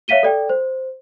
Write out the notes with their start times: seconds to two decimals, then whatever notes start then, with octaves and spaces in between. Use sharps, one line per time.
0.08 C#5 E5 F5 B6 D#7 G7
0.23 A4 D5 G5
0.49 C5